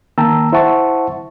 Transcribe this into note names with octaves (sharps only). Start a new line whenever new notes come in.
D#3 A#3 G5 A5 A#5 E6
E4 C5 E5 F#5 A5 C#6